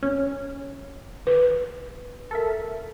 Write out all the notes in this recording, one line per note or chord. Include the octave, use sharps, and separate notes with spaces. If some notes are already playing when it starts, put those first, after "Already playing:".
C#4
B4
A4 A#4 E5